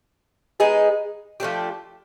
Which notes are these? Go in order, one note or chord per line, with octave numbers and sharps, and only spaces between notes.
G#3 B3 D#4 G#4
F3 A3 D4 G4